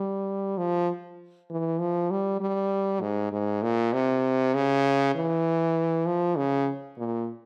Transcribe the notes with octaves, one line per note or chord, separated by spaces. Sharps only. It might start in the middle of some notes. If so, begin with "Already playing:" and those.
Already playing: G3
F3
E3
F3
G3
G3
G#2
G#2
A#2
C3
C#3
E3
F3
C#3
A#2